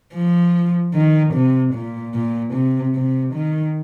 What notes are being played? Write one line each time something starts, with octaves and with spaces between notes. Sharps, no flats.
F3
D#3
C3
A#2
A#2
C3
C3
D#3